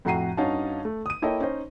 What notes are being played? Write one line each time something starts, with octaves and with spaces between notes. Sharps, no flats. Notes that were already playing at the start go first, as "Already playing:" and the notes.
F2 A2 F#4 A#5 C7 D#7
G2 C#4 D#4 F#4 F5 A5
A3
D#6 D#7
A#3 E4 A4 C#5 D#5 G5
C#4 D#4 C5 D#5